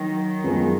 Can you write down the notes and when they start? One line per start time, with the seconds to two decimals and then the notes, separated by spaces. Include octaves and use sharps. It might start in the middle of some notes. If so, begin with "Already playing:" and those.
Already playing: D#3 F#3
0.44 F#2 F3 G#3 B3